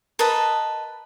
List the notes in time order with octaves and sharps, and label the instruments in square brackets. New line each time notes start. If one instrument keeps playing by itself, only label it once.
[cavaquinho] A#4 B4 D#5 A5